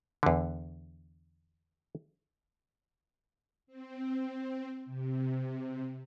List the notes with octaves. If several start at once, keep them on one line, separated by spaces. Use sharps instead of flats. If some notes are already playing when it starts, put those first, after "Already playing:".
E2 D3
C4
C3